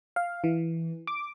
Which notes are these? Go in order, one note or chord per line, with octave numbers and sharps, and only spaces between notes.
F5
E3
D6